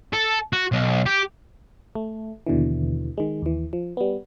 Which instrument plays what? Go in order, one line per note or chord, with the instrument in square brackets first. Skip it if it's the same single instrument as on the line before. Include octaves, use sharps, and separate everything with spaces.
[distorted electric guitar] A4
F#4
B1
G4
[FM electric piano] A3
D#2 B2 D3 E3
D#3 G#3
D#2 E3
F3
G3 B3